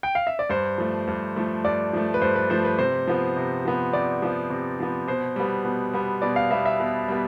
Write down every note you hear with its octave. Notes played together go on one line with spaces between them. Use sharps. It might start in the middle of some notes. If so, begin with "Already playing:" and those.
G5
F5
E5
D5
G2 C5
F3 A3
G2
F3 A3
G2 D5
F3 A3
B4
G2 C5
B4
F3 A3 C5
B4
C3 C5
F3 B3
C3
F3 B3
C3 D5
F3 B3
C3
F3 B3
B2 C5
G3 B3
B2
G3 B3
B2 D5
F5
G3 B3 E5
E5
B2
G3 B3